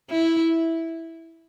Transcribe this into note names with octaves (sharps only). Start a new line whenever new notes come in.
E4